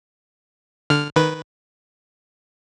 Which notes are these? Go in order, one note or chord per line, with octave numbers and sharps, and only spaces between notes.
D3 F6
D#3 B4